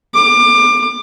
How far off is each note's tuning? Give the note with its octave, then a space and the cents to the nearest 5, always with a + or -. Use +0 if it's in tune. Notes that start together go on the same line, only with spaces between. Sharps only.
D6 +25